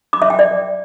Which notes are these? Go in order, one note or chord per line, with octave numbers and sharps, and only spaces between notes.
D6
E5
G5
D5